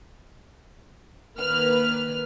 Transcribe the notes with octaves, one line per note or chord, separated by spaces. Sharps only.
D#3 A#3 B4 F6